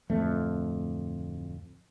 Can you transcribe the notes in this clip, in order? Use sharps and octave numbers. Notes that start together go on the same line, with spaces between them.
D1 F2 A3